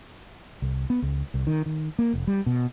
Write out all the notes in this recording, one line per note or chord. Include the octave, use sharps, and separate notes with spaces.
C2
B3
C#2
C2
D#3
D#3
A#3
F1
G3
B2